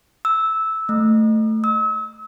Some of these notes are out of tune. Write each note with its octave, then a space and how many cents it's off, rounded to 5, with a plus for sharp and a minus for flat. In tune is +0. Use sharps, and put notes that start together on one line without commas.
E6 -10
A3 +5
E6 -40